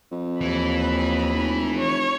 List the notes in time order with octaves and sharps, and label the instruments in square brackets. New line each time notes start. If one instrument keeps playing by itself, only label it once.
[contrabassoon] F2
[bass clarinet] D#2 [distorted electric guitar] E3 [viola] B5
[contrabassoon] F1
[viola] C#5